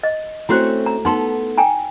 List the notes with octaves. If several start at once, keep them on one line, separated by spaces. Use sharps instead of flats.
D#5
A3 C4 C#4 E4 F#4 C5
A#5
B3 D#4 A4 C6
G5 G#5 A#5